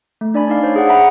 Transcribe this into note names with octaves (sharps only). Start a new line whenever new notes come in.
A3
D4 D5 G#5 B5
D4 D#4 D5 F5
C5 C#5
G#4 F#5
E5 F#5 A#5 B5